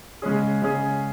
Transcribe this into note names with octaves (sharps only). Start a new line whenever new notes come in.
C#3 G#3 C#4 G#4
C#3 G#3 C#4 G#4